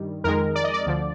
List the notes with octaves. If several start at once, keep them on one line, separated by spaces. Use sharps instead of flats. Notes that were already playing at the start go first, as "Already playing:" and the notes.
Already playing: G2 D#3 G3
F2 D#3 G#3 A#4
D5
D#5
D5
D2 D3 F3